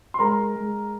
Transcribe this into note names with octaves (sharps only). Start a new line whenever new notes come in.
C6
G#3 A#4 A#5
G#3